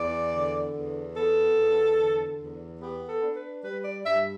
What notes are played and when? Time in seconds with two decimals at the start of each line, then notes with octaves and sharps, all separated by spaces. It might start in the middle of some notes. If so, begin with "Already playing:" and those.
Already playing: E2 D5
0.34 D3
0.75 E2
1.16 B3 A4
1.58 E2
1.99 D3
2.40 E2
2.81 B3 G4
3.08 A4
3.22 D4
3.36 B4
3.64 G3 B4
3.84 D5
4.05 G2 E5